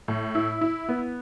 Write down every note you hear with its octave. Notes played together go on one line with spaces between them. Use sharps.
A2
E4
E4
B3